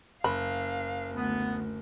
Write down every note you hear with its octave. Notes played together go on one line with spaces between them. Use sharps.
F#1 F5 B5
D2 B3